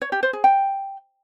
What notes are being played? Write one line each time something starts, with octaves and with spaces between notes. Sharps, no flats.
C#5
G4
C5
G#4
G5